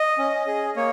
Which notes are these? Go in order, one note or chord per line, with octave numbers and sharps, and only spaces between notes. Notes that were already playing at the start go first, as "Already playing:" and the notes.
Already playing: D#5
C#4
G#4
A#3 C#5